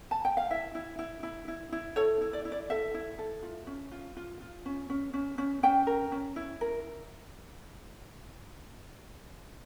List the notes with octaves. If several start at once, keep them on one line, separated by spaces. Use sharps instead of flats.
A5
G5
F5
E4 E5
E4
E4
E4
E4
E4
A4 C#5
E4
D5
E4
D5
A4 E5
E4
A4
F4
C#4
F4
F4
F4
C#4
C#4
C#4
C#4
C#4 G5
A#4
C#4
E4
A#4